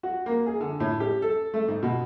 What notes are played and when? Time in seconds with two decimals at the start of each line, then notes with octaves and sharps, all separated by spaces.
0.03 F#4
0.26 A#3
0.46 G#4
0.61 D3
0.80 A2
1.00 G4
1.22 A4
1.54 A3
1.68 G#2
1.83 B2